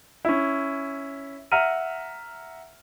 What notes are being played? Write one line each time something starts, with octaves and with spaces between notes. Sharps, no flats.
C#4 E4
E5 F#5 A#5 F6 D#7